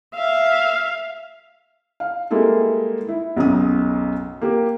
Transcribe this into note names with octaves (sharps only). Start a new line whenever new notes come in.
E5 F5
F5
G3 G#3 A#3 E4 A4
E4
B1 F#2 C#3 D#6
A#3 G4